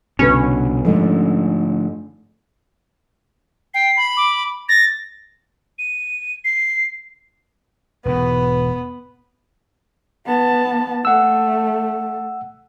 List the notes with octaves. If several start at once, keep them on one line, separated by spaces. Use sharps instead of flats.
C2 B2 D3 C#4 B4
G#2 D3 F3 A3
G5 C7
B5
D6
A6 A#6
D#7
C7
E1 G#2 B3 B4
B3 A5
A3 F#5 E6